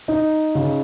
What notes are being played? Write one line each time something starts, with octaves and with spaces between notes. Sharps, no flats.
D#4
C#3